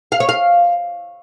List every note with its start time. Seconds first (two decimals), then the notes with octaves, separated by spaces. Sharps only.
0.12 F5
0.20 C#5
0.29 F5